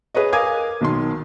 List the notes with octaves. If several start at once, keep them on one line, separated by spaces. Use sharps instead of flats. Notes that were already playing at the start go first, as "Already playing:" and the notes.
G#4 B4 C#5 D#5
A#4 F5 G#5 D6 D#6 G#6
B1 D#3 C6